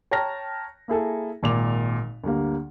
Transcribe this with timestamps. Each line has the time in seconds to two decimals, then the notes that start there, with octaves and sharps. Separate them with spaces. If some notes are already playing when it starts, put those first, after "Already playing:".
0.11 C#5 G5 A5 A#5 F6 A#6
0.88 A#3 E4 G#4 A4
1.43 G#1 A#2 D6 F7
2.24 D2 G2 G3 A#3